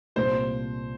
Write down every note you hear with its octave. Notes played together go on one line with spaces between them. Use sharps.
C2 A#2 G3 C5